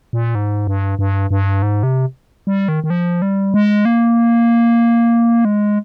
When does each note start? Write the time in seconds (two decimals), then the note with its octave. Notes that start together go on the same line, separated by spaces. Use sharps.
0.13 A#2
0.35 G#2
0.67 G2
0.99 G2
1.31 G2
1.62 G#2
1.83 C3
2.47 G3
2.68 D#3
2.84 D#3
2.90 F3
3.22 G3
3.54 G#3
3.85 A#3
5.45 G#3